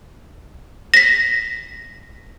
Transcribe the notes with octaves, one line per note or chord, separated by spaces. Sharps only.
A#6 B6